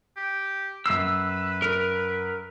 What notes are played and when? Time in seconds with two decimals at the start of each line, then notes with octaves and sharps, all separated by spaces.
0.17 G4
0.86 F#2 B4 E6 C7
1.62 A#4